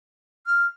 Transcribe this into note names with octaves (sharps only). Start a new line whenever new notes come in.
F6